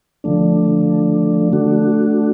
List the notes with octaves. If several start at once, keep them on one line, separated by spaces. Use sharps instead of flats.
D3 F3 A3 D4
A3 D4 F#4